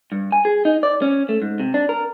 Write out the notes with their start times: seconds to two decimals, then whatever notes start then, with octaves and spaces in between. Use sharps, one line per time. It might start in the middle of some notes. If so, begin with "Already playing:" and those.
0.12 G2
0.32 G#5
0.45 G#4
0.65 D#4
0.83 D5
1.02 C#4
1.29 A3
1.42 G#2
1.60 C3
1.74 D4
1.89 A#4